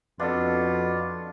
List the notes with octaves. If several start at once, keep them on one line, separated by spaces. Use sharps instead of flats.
F2 B2 D4 F4 A4